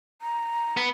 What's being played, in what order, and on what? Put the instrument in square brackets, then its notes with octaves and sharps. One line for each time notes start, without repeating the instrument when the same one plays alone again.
[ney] A#5
[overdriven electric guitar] B3 B4